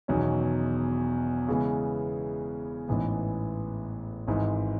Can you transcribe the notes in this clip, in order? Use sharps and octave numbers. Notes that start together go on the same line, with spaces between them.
E1 E2 D#3 F#3 C#4
C#3 E3 G#3 B3
A1 G#2 E3 B3
G#1 G#2 E3